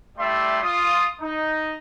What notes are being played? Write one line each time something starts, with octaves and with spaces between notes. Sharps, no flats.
G3 A3 E4 D5 E5 C6
F4 D#6
D#4